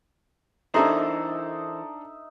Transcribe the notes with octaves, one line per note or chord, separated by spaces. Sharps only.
E3 D4 D#4 A4 A#4 C5 E5 A#5